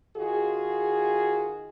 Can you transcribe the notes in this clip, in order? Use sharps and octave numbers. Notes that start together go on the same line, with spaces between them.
D#3 F4 F#4 G#4